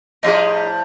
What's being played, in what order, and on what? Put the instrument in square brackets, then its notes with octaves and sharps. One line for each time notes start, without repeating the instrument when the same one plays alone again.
[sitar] A2 F3 G3 [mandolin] D#4 F4 G#4